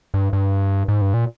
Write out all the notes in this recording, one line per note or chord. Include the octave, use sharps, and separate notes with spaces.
G2
G2
G#2
G2
A#2